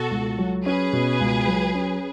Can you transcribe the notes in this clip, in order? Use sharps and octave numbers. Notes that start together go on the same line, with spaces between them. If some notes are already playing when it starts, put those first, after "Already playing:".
Already playing: B2 F#4 A4
C#2
F#3
C#4 G#4 B4
B2
C#2
F#3
C#4